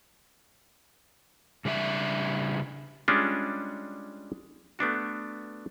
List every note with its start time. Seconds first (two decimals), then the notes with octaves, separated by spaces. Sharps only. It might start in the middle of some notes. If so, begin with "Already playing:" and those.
1.65 C#3 G3 D4 E5
3.08 G3 G#3 C#4 D4 F4
4.79 A3 B3 D4 F#4